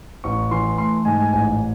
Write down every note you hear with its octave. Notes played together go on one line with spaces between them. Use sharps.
A1 C#6
E3 C6
A3 C6
G#2 G#5
G#5
A1 G#5